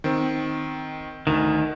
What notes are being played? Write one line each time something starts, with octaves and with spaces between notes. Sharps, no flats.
D#3 C4
D2 D#3